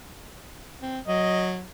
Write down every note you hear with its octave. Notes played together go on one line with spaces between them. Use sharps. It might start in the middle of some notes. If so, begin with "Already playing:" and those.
C4
F#3 D#5